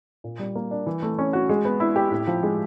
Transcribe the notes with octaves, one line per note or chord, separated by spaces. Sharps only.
A#2
G3
A#3
D4
E3
A3
C#4
F#4
G#3
B3
E4
G4
A2
F3
G#3